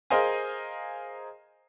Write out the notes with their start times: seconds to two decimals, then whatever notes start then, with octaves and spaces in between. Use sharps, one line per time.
0.10 G#4 A#4 C5 D#5 F5 G#5